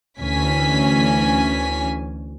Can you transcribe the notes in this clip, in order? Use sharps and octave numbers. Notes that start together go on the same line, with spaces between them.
D2 E3 C#4 G#5 B6